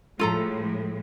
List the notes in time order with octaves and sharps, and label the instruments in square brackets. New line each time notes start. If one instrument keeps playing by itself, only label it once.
[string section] A2 F3 G#3 [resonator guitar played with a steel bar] F4 A4 A#5